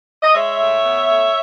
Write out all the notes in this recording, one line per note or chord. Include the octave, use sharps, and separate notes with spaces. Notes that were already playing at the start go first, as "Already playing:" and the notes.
D#5
G#3 C#5 E5
A2
B3
A3